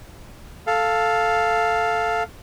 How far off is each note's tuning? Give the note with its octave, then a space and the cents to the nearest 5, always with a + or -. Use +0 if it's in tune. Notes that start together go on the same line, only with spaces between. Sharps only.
A4 +0 F5 +0